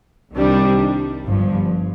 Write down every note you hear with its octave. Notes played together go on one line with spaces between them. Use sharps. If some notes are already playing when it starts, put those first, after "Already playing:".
C2 C3 D#3 G3 D4
G1 G2 F3